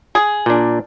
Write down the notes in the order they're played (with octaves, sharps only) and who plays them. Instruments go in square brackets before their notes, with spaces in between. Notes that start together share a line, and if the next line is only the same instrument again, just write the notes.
[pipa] G#4
[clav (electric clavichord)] A#2 D4